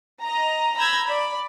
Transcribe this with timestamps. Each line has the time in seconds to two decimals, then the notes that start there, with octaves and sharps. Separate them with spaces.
0.23 D#5 A#5
0.77 A#5 B5 E6 G6 G#6 A#6
1.07 D5 B5